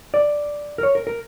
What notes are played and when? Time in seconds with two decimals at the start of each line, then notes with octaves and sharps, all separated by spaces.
0.14 D5
0.78 A#4
0.83 C#5
0.95 A#4
1.07 A#4